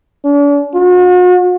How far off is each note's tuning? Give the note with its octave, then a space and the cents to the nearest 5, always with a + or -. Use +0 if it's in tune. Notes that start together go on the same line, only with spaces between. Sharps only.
D4 -40
F#4 -45